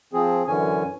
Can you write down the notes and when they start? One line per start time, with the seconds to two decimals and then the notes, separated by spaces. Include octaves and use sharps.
0.13 F3 C4 G#4
0.47 F#2 D3 E3 C#4 G#5